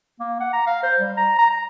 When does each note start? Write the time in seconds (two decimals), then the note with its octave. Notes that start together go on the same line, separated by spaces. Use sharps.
0.20 A#3
0.41 F#5
0.53 A#5
0.67 F5
0.83 C5
1.00 G3
1.17 A#5
1.38 A#5
1.51 A#5